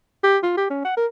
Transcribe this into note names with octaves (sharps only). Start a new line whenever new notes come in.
G4
F4
G4
C#4
F#5
A#4